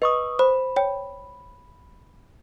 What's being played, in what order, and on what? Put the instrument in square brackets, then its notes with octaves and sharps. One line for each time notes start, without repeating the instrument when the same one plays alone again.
[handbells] B4 C#6 D#6 [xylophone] D#5
[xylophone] C5 [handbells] B5
[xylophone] C#5 G5